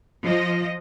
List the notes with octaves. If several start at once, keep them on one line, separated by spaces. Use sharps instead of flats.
F3 D#5